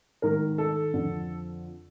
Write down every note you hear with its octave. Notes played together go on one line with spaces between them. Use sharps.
G#2 D#3 A#4
A4
F2 D3 F3